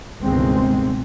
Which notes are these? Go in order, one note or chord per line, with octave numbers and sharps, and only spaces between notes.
G1 C#2 B2 D#3 G#3 C4